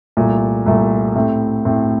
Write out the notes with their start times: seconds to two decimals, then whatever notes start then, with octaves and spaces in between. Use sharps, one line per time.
0.17 C2 A#2 A3
0.66 C2 A#2 A3
1.15 A2 A3 C4
1.65 A2 A3 C4